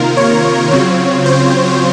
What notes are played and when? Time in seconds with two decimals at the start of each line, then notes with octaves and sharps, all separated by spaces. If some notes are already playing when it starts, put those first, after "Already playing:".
Already playing: C3 D#3 A#3 F4 A#4
0.17 C#5
0.71 C#3 F#3 C4 F4 C#5
1.25 C5